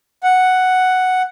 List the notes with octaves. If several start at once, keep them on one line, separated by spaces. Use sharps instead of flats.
F#5